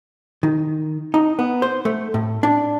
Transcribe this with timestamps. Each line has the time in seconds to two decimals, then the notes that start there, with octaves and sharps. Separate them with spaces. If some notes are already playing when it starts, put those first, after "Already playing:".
0.43 D#3
1.14 D#4
1.39 B3
1.62 C5
1.85 A3
2.14 A2
2.43 D4